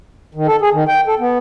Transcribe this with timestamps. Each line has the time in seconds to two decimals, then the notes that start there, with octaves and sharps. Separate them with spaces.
0.35 D#3
0.47 A4
0.61 G#4
0.73 D#3
0.88 G5
1.07 A4
1.19 B3